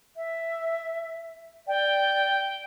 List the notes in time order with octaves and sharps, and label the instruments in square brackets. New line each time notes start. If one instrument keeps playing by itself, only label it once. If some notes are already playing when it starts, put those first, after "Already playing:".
[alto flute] E5
[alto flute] D5 [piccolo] G5